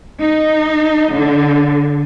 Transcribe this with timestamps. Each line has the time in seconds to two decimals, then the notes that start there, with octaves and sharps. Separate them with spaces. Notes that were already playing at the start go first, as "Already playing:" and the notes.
0.21 D#4
1.12 D3